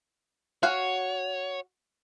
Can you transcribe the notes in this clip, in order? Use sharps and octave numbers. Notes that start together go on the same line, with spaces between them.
F#4 C#5 F5 G#5